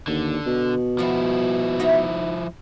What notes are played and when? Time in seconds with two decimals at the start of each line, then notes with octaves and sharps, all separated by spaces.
0.08 D#2 D3
0.46 B2
0.99 F3 G3 E4 F#4
1.80 D#4 F#4 E5